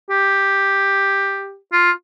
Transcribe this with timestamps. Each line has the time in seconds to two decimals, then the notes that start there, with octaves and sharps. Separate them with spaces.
0.10 G4
1.73 F4